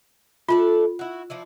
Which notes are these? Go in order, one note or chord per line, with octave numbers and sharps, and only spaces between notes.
A3 D4 F4 A4
E4 F#4
F3 D4 E4